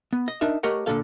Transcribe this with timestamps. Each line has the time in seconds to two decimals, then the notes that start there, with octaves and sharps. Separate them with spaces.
0.13 B3
0.28 D#5
0.41 D4 D#4 A#4 E5
0.63 A3 G4 A#4 C#5 D#5 F#5
0.86 A#2 D3 E3 A4 F5